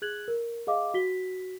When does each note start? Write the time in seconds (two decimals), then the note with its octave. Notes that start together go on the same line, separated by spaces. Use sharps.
0.02 G#4 F#6 G#6 F#7
0.28 A#4
0.67 G#4 D#5 F5 D6
0.94 F#4 B6 G7